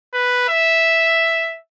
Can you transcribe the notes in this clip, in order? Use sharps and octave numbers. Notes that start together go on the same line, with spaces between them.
B4
E5